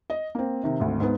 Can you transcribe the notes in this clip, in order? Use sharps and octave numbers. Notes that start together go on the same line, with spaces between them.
D#5
A#3 C4
C3 D#3
G#1 D2
G#2 B3